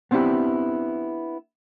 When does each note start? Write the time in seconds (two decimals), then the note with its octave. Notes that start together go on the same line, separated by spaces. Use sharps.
0.11 B3 C4 D4 E4 G4